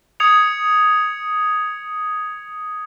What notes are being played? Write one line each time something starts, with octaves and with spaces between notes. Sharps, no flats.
D#6 G#6 C#7 F7